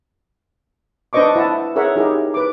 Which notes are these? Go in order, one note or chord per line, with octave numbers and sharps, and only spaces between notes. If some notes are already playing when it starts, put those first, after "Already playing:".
D4 B4 C5 D#5 C#6 D6
E4 F#5 A5
G#4 A#4 C#5 E5 F#5
D#4 E4 G4 G#4 A#4
B4 D6